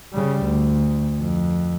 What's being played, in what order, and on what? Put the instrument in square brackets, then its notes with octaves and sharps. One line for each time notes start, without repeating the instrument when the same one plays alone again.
[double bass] C#3 G3
D2
F2